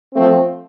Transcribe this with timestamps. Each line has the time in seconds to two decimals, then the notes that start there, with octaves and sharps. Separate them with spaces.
0.14 F3 A3 C4